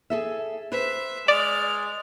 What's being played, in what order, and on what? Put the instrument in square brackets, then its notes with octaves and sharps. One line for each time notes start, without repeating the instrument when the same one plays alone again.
[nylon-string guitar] G#4 A4 E5
[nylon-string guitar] B4 C5 [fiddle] E5
[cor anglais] G#3 [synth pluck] D5 [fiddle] F6